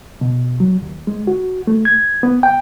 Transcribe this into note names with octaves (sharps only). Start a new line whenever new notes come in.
B2
F#3
D#2
G#3
F#4
A3
G#6
B3
G5